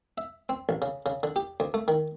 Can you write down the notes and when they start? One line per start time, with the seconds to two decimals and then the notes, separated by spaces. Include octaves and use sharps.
0.18 E5
0.49 C4
0.69 A1
0.82 C#3
1.06 C#3
1.23 D3
1.36 G4
1.60 D2
1.74 A3
1.88 D#3